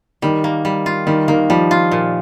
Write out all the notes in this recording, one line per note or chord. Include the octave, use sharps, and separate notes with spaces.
D#3 G3
A#3
G3
F4
D#3 G3
D#3 A#3
F3 G3
F4
A#2